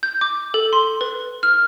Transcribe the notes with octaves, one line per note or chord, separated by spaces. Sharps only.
G6
D6
A4
C6
B4
F6